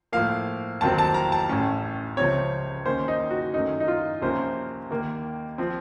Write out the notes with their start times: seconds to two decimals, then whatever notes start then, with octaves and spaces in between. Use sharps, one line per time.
0.12 A2 F3 A#3 F5
0.81 F1 D#2 D#3 F#3 C4 A5
0.98 A5
1.14 A#5
1.32 A5
1.49 A1 A2 A3 C#4
2.17 C#2 C3 F3 C4 C#5
2.85 D#2 D#3 A#3 C#4 C5
3.08 D#4
3.30 F#4
3.53 F#2 D#3 A3 C#4 D#4
3.80 D#4
3.88 F4
4.22 C2 C3 F3 A#3 C#4 C5
4.90 D#2 D#3 A#3
5.58 F3 C4